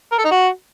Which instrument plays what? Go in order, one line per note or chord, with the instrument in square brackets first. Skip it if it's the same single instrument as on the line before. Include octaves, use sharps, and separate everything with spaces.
[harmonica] A#4
A4
D#4
F#4